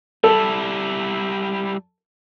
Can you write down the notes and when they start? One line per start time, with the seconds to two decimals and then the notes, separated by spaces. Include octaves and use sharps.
0.24 G3 E4 A4